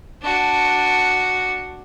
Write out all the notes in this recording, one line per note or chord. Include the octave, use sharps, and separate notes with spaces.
D4 F#4